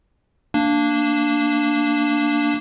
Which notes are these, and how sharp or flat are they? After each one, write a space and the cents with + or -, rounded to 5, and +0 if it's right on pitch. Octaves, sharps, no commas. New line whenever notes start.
A#3 -10 D4 +0